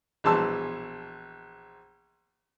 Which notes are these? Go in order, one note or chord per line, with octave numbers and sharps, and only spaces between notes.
A#1 B2 E3 A5 C6 E6